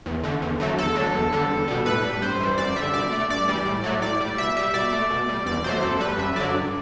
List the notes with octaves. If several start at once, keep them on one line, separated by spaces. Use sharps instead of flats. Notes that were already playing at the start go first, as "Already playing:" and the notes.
E2
D3 A3
E2
D3 F#3 A3
E2 A4
D3 F#3
E2
D3 G3
E2
B2 G3
A2 B4
G3
G2 C5
E3 G3
F#2 D5
D3 G3 E5
B2 D5
A3
G2 D5
E3 G3 D5
A2
F#3 A3
A2 D5
G3
B2 E5
G3 E5
B2 D5
A3
B2
G3
E2 D5
B2 F#3 A3 C5
F#2 A4
E3 G3 B4
F#2 E5
D3 F#3 D5
G2